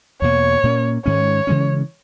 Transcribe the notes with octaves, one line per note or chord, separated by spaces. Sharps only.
E2 B2 A#3 C#5
A#2 A#3 C#4
G#2 D#3 G#3 C#4 C#5
C#3 E3 G#3 C#4